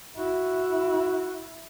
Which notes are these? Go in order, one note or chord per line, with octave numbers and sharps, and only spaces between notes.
E4 F#4